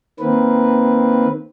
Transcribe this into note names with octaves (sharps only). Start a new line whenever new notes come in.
D#3 A#3 C4 B4